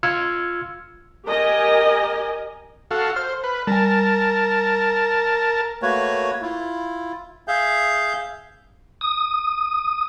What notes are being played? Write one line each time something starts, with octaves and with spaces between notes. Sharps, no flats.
F4 E6 F6 G#6 C#7
G4 A#4 D#5 G#5
F#4 A4 F5
C5 F6
B4
G3 A#4 G#5 A5
A3 A#3 F#4 B4 C#5
E4 F4
G#4 E5 F5 G6
D#6